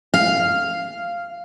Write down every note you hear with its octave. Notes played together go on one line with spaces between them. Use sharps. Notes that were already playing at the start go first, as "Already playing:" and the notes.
F5